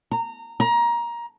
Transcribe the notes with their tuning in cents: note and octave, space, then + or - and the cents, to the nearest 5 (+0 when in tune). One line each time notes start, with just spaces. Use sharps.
A#5 -20
A#5 +20